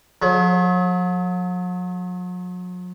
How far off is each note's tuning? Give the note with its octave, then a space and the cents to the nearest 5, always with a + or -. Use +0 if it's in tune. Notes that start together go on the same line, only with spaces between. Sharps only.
F#3 -45 G#4 +45